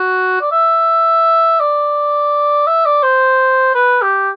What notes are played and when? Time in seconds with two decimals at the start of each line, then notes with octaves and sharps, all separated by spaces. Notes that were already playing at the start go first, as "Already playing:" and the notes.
Already playing: F#4
0.41 D5
0.52 E5
1.60 D5
2.67 E5
2.86 D5
3.03 C5
3.75 B4
4.02 G4